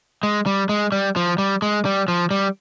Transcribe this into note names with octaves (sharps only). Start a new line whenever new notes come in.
G#3
G3
G#3
G3
F3
G3
G#3
G3
F3
G3